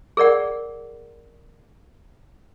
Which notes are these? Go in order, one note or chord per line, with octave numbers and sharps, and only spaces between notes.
G#4 A#4 D5 F#5